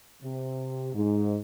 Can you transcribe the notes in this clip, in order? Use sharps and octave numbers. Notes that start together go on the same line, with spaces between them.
C3
G#2